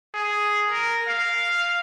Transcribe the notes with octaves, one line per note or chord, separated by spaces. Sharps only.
G#4
A#4
F5